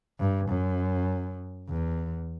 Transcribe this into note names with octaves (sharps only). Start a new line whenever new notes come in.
G2
F#2
E2